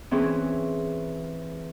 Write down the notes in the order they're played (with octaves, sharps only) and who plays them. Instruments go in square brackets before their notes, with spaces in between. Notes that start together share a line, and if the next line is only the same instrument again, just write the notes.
[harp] E3 C4 C#4 G#4